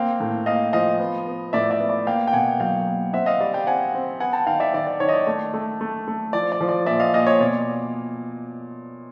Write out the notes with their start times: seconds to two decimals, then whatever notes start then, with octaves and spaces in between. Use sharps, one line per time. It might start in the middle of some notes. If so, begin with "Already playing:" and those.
Already playing: A#3 C4 F5 G5
0.20 A2
0.46 A#3 D#5 F5
0.73 F3 D#5 F5
1.00 B3
1.27 B3
1.53 A2 D5 E5
1.71 D5 E5
1.80 B3
1.89 D5
2.07 A#3 F5 G5
2.27 G5
2.33 B2 F#5 G#5
2.60 F#3 F5 G5
2.87 A#3
3.13 C4 E5 F#5
3.26 D#5 F5
3.40 G3 D5
3.53 F5 G5
3.66 C4 F#5 G#5
3.94 C4
4.20 B3 F#5 G#5
4.33 G5 A5
4.46 D#3 F5 G5
4.60 D5 E5
4.74 D#3 D5
4.87 D5
5.00 D#3 C#5
5.09 D#5
5.13 D5
5.27 A3
5.54 A3
5.81 A3
6.08 A3
6.33 F3 D5
6.52 D5
6.61 F3
6.69 D5
6.86 A#2 D5 E5
7.00 D#5 F5
7.14 A#2 D#5 F5
7.27 C#5 D#5
7.40 B2 D5